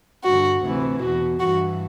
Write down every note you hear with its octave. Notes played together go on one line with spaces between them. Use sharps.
G2 D3 F#4
D2 C3 E3
E2 B2 F#4
G2 E3 F#4